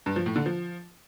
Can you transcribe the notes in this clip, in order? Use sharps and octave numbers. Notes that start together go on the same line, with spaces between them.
G2
F3
A2
D3
F3